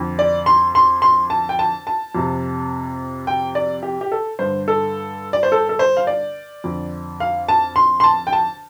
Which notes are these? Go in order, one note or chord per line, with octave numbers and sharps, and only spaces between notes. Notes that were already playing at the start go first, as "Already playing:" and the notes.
Already playing: F2 D3
D5
C6
C6
C6
A5
G5
A5
A5
F2 C3
G5
D5
G4
G4
A4
G2 D3 C5
A4
D5
C5
A4
A4
C5
F5
D5
F2 D3
F5
A5
C6
C6
A5
G5
A5